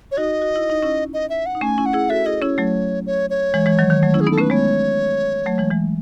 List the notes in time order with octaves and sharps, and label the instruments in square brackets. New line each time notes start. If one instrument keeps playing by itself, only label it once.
[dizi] C#5
[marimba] D#4 F#4 [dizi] D#5
[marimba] F#4
E4
D#4
C#4 E4
[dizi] D#5
E5
F#5
[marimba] D#4
[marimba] A3 C#4 [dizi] G#5
[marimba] C#4 E4
[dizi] F#5
[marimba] E4 G#4
[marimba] F#4 A4 [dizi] E5
[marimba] E4 G#4 [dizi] D#5
[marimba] C#4 E4 [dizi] C#5
[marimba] F#3 A3
[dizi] C#5
C#5
[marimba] E3 G#3
E3 G#3
D#3 F#3
D#3
F#3 A3
C#4 E4
[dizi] G#4
[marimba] B3 D#4
[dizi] A4
[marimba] A3 C#4 [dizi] B4
[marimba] G#3 B3 [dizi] C#5
[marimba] F#3 A3
E3 G#3
E3 G#3